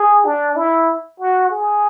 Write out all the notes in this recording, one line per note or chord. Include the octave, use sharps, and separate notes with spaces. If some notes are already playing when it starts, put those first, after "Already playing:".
Already playing: G#4
D4
E4
F#4
G#4